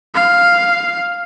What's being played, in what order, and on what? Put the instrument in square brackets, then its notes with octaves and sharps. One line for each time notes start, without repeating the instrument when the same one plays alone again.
[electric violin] F5